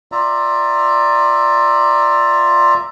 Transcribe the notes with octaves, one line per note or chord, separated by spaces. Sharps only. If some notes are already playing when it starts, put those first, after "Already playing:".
F4 D5 E5 A#5